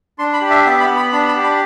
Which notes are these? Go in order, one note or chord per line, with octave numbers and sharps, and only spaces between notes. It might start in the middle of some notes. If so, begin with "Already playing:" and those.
D4 C6
B5
G4
E5
B3 E5
B5
B3
B5
D4 B5
B5
G4
B5